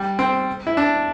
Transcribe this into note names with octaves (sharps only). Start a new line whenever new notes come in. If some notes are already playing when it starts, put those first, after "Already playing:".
Already playing: G3
C4
E4
D4